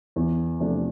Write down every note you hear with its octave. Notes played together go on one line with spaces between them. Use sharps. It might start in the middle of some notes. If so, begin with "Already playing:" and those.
E2
C3 F3 A3 D4